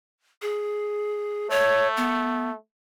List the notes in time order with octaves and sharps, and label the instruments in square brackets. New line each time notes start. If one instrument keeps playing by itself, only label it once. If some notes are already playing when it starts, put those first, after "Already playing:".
[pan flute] G#4
[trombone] A3 [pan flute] C#5
[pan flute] B3